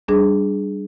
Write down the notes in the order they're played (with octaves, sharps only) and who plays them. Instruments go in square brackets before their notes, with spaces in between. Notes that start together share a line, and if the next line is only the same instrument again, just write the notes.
[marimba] G3 D4 G#4